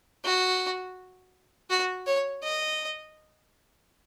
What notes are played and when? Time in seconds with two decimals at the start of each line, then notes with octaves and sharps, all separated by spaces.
0.24 F#4
1.70 F#4
2.07 C#5
2.43 D#5